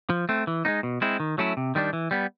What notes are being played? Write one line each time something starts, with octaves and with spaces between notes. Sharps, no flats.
F3
A3 C4
E3
G#3 B3 D#4
B2
G#3 C4 E4
D#3
F#3 A3 C#4 E4
C3
D#3 G3 B3 D4
E3
G3 B3